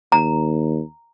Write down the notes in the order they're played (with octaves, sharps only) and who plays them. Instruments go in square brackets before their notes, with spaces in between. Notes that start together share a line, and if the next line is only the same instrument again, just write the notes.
[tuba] D#2 [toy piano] A#5